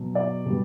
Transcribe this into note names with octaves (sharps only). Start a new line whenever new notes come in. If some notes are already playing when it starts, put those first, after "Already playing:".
Already playing: B2 F#3
D5
B2 G3